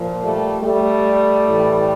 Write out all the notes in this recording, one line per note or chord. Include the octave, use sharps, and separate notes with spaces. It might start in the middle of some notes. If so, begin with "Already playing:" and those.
Already playing: A#2 F3
G3 A3
G3 A3
A2 E3